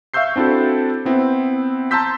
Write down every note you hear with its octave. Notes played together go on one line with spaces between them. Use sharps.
E5 F5 C#6 E6 G6 C7
C4 D4 E4 F#4 A4
B3 C4 E4
A5 A#5 C6 E6 G6 B6